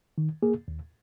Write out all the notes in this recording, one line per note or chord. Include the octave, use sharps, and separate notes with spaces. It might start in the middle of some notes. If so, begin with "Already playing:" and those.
D#3
A#3 G#4
D#2